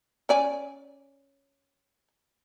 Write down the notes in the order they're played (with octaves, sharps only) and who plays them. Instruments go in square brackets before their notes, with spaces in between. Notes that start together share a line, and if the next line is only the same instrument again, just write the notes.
[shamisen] C#4 D5 G#5